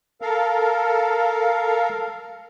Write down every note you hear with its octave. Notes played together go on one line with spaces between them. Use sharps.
A4 A#4 F5